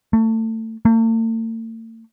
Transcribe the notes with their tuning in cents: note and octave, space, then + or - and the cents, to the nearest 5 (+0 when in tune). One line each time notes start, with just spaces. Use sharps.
A3 +25
A3 +45